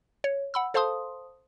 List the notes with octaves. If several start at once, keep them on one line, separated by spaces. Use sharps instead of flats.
C#5
F#5 B5 E6
A4 C5 F5 A5 C6 D#6